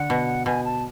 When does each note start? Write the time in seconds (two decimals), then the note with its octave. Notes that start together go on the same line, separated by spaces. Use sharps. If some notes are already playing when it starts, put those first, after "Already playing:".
Already playing: D3 F#5
0.10 B2
0.46 B2 G#5
0.64 A5